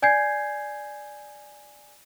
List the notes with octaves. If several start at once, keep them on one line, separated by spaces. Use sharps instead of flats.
D5 G#5 G6 G#6 C7